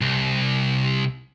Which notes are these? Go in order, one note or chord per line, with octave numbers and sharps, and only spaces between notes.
C2